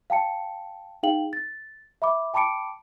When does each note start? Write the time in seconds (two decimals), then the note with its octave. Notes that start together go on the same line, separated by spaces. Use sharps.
0.10 F5 G5 A5 C#7
1.03 D#4 G#4 F5 G5 F#7
1.33 A6
2.02 E5 B5 D6
2.34 G5 A5 B5 D6 C#7 D7